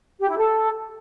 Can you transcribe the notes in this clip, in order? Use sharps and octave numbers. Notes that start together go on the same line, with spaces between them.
G4
E4
A4